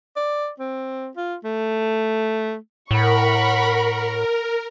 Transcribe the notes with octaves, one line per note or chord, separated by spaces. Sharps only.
D5
C4
F4
A3
A2 A#4 F#5 B5 C#6